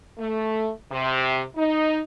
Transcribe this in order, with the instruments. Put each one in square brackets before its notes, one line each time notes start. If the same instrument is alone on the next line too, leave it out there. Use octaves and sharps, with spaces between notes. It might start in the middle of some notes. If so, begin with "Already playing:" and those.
[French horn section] A3
C3
D#4